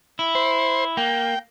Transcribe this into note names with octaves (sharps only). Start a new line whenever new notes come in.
E4
C5
A#3 G5